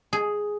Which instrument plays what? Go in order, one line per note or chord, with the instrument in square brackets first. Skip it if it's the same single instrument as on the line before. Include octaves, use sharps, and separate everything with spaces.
[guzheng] G#4